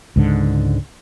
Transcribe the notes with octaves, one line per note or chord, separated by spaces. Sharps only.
C#2 G#2 D3